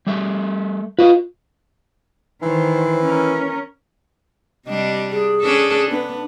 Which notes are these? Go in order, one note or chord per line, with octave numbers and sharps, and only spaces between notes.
G3 A3 E5
F4 B4 D#5
D#3 E3 C5
C#4 A#4
C3 G3 D4 D#5
G#4
C#4 D4 A4
B3 D4